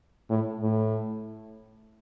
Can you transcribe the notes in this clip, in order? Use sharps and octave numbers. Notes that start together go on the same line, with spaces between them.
A2
A2